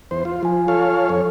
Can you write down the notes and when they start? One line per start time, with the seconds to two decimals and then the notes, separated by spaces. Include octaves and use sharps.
0.11 E2 C5
0.25 F4
0.43 F3 F4 G#5
0.68 A4 C#5 F5
1.09 F2 A4 C#5